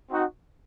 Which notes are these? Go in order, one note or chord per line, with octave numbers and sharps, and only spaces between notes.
C4 D#4 F#4